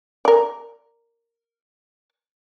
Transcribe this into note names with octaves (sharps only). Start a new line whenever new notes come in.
A#4 D5